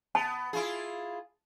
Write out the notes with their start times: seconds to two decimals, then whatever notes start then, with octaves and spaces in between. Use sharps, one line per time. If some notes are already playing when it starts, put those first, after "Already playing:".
0.15 B3 A5
0.53 E4 F4 G#4